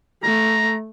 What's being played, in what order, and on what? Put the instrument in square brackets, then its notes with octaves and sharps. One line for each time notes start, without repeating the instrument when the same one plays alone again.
[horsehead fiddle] A3 [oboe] A#5